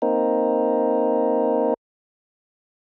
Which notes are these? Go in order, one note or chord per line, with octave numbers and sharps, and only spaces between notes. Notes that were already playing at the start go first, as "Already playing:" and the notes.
A#3 C4 D#4